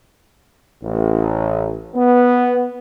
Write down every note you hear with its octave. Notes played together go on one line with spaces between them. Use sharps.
A1
B3